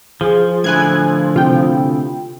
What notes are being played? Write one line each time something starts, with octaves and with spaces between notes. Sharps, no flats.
F3 G#4
A2 D3 E4 G#5 F#6 G#6
C3 F4 G5